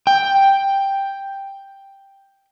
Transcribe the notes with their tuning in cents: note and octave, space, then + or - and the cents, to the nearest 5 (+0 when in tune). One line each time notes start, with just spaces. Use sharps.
G5 +5